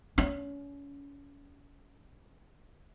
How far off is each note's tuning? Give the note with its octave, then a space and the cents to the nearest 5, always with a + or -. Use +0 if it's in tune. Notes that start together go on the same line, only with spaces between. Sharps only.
C#4 +30